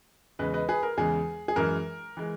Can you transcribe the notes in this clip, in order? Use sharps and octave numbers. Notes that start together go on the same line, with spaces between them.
E2 C#3 G#3 B4 D#5
B4 D#5
G#4 B4
A#4
E2 C#3 G#3 G#4
G#4
F#2 E3 G#3 A#4
E3 G#3